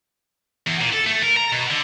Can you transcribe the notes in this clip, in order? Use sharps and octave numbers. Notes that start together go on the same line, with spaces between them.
E2
A#2
A4
A3
A#4
A#5
B2
D3